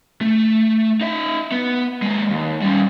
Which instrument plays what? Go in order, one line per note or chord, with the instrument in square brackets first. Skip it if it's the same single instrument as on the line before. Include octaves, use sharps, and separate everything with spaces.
[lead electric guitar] A3
D#4 E5
B3
G#3 A#3
D#2
G3 C#4